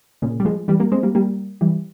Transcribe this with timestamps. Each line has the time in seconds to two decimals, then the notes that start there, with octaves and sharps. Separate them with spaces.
0.22 A#2 C#3
0.40 G3
0.45 F3 G#3
0.68 E3 G3
0.80 G3 A#3
0.92 G#3 C4
1.03 G3 A#3
1.15 G3 A#3
1.61 E3 G3